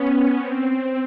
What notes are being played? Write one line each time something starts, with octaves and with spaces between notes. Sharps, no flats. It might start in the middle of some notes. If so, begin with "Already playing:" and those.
Already playing: B3 C#4
C4